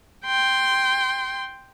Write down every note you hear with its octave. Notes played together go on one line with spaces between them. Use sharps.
G5 C6